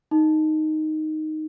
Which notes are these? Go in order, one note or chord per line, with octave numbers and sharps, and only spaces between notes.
D#4